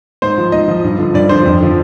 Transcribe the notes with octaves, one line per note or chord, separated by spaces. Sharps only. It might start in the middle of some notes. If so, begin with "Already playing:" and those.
G#2 C5
F3
G#2 D#5
F3
G2
D3 F3
G2 D5
D3 F3 C5
F2
D3 F3